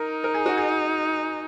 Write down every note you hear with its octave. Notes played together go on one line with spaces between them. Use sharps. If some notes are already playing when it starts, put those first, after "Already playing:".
Already playing: D#4 A#4
A#4
G#4
F#4
G#4